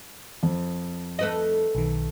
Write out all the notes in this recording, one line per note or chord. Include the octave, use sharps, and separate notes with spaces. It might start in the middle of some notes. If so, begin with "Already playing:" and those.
F2
A3 B4 D#5
B1 D#3